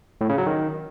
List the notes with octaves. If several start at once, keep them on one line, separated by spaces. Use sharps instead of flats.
A2
C#3
F#3
D#3